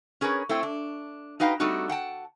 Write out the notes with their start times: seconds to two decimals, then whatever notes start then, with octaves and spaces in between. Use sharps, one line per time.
0.21 C#4 G#4 A#4 B4 C#5
0.49 A3 C4 E4 C5 G5
0.63 D4
1.40 D#4 F#4 B4 F5 G5 A#5
1.60 G3 A3 C4 D4 D#4 F#4
1.89 F#5 G5 A5